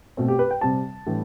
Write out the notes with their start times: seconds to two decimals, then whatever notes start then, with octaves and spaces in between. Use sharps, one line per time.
0.17 B2 A3 C4
0.28 G4
0.39 B4
0.51 G5
0.61 C3 G3 C4 A5
1.06 A2 E3 G3 B3 D4